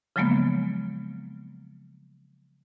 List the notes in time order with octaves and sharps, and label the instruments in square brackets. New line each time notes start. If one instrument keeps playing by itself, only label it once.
[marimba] C#3 F3 F#3 G#3 A#3 B3